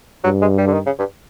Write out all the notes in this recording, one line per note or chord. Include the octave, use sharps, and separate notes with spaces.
G2 F#3
G#3
G3
D3
D#3
C#3
G2